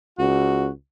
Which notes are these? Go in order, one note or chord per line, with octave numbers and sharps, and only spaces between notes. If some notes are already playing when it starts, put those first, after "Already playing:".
C#2 F#4